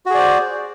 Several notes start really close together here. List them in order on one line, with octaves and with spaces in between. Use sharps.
F#4 G#4 D5 C5